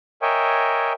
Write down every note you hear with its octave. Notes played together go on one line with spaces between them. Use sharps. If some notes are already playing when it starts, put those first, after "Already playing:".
A#4 C#5 D#5 E5 G5 G#5